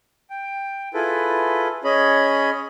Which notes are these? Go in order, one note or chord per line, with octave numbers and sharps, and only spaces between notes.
G5
E4 F4 G#4 A4 B4
C#4 G#4 C#5 D#5 B5